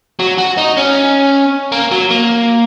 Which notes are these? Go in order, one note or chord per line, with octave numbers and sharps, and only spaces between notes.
F#3
F#4
D#4
C#4
A#3
F#3
A#3